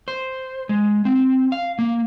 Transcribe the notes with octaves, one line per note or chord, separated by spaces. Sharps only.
C5
G#3
C4
F5
A#3